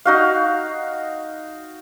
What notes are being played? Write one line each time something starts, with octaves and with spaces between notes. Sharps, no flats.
D#4 F#4 F5